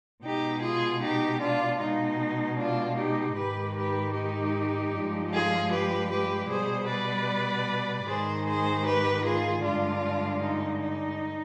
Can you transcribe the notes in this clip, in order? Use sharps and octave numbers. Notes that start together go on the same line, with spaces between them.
B2 G#3 D#4 G4
F4 G#4
D#4 G4
D4 F4
B2 G#3 D#4
D4 F4
D#4 G4
G#2 D#3 G#3 G4 B4
G4 B4
D#4 G4
G2 F3 G#3
F4 G#4
G4 B4
G4 B4
B2 G3 G#4 C5
B4 D5
G#2 D#3 G#3 G#4 C5
G#4 C5
G4 B4
F4 G#4
G2 D3 G#3 D4 F4
D#4
D#4